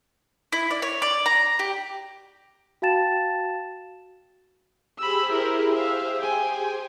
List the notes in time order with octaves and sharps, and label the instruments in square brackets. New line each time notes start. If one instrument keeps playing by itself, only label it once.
[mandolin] E4
D5
C#5
D5
A#5
G4
[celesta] F#4 F5 G5 A5 A6 E7
[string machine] G4 G#4 C5 [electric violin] B5 E6
[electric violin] E4 A#4
E5 F5
G5 G#5